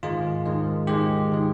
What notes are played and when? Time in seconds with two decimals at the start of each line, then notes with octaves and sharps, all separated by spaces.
0.03 G#2 D#3 G#3 F4
0.46 G#2 D#3 G#3
0.87 G#2 D#3 G#3 G4
1.32 D#3 G#3